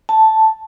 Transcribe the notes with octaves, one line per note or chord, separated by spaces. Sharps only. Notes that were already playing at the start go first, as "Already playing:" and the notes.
A5